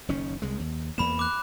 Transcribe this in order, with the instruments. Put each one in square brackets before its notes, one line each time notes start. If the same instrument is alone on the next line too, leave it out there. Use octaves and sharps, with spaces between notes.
[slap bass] F#1 D#3 C#4
C2 G#3
D#2
[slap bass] E2 A#3 [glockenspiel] B5 E7
[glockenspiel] D6 F#6